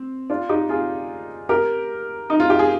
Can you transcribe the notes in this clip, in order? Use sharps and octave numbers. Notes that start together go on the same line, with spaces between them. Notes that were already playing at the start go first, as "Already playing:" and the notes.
Already playing: C4
D4 F4
D#4 G4
F4 G#4
G4 A#4
D#4
F4
G4
G#4